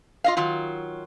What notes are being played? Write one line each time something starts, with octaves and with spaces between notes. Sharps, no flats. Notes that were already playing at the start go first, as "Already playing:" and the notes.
F4 D#5 F5
D#3 F#3 F4